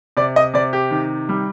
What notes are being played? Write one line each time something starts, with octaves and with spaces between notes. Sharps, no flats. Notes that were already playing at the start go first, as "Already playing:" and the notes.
C3 D5
D#5
C3 D5
G4
D#3
G3